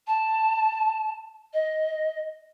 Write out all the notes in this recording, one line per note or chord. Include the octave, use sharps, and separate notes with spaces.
A5
D#5